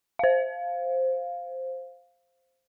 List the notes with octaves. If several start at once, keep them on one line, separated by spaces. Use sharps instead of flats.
C5 F5